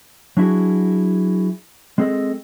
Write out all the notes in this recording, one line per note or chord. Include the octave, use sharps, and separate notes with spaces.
F#3 D4 E4 F#4 G#4
G#3 C4 G#4 A4 D#5